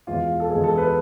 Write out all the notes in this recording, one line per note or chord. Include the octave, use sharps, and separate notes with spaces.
E2 B2 G#3 F4
A4
E2 B2 G#3 G#4
A4
B4